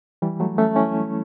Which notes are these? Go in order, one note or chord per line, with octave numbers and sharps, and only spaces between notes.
E3 G3
F#3 A3
A3 C#4
C#4 E4